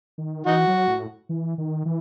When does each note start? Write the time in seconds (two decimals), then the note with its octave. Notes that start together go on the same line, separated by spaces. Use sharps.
0.18 D#3
0.46 E3 D#4 F#4
0.67 F#3
0.88 A2
1.29 E3
1.58 D#3
1.85 E3